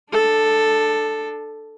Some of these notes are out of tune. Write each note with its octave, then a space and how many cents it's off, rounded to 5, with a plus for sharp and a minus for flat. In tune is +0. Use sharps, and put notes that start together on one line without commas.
D4 +25 A4 +0